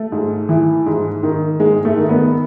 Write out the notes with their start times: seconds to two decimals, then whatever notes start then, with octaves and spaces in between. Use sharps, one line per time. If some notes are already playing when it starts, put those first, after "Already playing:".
Already playing: A3
0.12 G#2
0.49 E3
0.86 G#2
1.23 D#3
1.60 G#2 G#3
1.85 A3
1.97 D#3
2.09 B3